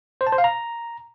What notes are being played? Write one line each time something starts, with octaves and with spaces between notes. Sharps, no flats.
C5
A5
C5
F5
A#5